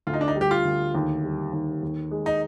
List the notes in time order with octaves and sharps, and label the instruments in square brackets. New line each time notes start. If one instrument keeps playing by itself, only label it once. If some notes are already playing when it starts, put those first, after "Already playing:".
[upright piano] D2 [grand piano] F4
[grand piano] D#4
D4
D#4
[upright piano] G3
[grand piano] G4
F4
[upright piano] D2
D#2
G3
D#2
D#2
G#3
[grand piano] D#4